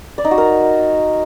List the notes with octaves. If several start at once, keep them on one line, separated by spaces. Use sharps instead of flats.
D5
D#4
F#4
A#4